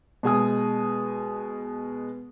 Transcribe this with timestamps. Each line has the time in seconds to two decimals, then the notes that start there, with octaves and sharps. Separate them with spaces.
0.23 B2 G#3 G#5 D#6